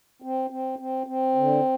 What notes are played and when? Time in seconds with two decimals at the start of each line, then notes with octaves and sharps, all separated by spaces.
0.22 C4
0.50 C4
0.79 C4
1.07 C4
1.35 D3